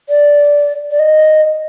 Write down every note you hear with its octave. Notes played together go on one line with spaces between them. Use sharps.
D5
D5
D#5